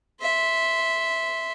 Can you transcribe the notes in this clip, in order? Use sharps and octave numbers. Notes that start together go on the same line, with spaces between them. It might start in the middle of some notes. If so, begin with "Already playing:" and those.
E5 C6